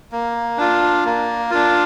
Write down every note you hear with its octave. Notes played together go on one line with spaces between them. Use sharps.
A#3
D4 F4
A#3
D4 F4